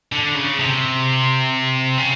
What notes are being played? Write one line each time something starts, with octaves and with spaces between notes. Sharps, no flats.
D3
C#3
C3
C#3